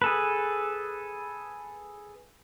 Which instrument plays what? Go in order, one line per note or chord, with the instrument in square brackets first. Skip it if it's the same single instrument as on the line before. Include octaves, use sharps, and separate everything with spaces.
[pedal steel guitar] G#4 A4 B4